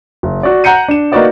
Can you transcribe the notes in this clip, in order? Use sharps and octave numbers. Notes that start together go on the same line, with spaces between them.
F#1
F#4 D5
F#5 A#5 G6 C#7 D#7
D4 E7
A#3 D#4 F#4 B4 D5 D#5